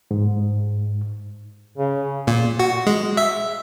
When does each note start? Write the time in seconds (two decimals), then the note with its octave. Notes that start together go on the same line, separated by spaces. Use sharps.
0.11 G#2
1.78 C#3
2.27 A#2
2.59 F#4
2.87 G#3
3.17 E5